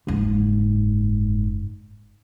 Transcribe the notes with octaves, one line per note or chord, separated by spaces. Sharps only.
F#1 G#2